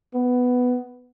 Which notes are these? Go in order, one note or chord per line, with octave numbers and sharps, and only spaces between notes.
B3